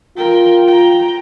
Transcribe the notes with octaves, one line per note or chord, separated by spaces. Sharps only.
F4 A#4 G5
G5 A#5